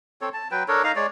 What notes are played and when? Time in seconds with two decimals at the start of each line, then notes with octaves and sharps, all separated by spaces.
0.21 C4 A4 C#5
0.33 A5
0.51 F#3 B4 G5
0.68 D4 A4 A#4 C#5
0.84 D#4 F5 A#5
0.96 G#3 C#5 D5